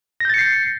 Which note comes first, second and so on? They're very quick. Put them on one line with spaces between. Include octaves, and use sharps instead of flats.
A#6 G6 A6 C#7 C7